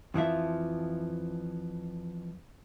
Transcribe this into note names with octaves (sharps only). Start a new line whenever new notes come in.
F2 E3 F3 E5